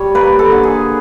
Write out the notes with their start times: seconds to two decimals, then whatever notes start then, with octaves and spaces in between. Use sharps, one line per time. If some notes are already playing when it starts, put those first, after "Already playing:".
Already playing: G3 C#5
0.15 A#3 B4
0.39 A4
0.52 D3
0.63 G#4